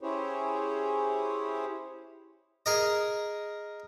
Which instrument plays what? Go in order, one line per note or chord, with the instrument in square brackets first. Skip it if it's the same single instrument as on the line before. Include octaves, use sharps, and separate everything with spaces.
[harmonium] C#4 E4 G4 G#4 C5 C#5
[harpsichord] G#4 A#4 D#5